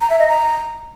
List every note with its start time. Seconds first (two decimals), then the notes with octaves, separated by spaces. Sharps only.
0.01 A#5
0.10 E5
0.19 D#5
0.29 A#5